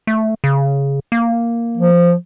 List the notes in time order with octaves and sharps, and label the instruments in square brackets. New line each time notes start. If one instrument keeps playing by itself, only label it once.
[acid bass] A3
C#3
A#3
[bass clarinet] F3